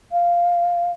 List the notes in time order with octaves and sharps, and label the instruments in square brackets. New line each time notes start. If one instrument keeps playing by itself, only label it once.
[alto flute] F5